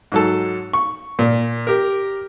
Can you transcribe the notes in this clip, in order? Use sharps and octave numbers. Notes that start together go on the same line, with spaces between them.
G#2 F#3 A4
C#6
A#2
G4 A#4